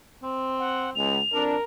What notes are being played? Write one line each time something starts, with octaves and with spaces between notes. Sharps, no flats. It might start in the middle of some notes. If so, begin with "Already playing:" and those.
C4
F#5
C#2 F7
F2 D4 A#4